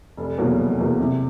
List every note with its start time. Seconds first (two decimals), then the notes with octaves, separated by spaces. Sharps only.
0.17 F1
0.38 E2 B2 F#3 A#3
0.58 F1
0.78 E2 B2 F#3 A#3
0.99 C3